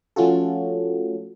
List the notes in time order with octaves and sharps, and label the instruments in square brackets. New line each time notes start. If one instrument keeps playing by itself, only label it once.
[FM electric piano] F3 A3 C#4 F4 F#4 A4